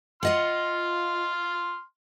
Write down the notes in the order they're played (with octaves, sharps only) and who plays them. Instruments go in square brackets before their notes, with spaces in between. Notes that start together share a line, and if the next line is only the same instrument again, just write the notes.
[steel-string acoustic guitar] F4 D#5 F#5 [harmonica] C6 F6